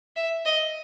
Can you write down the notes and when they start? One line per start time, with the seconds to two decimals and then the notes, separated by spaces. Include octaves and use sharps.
0.16 E5
0.45 D#5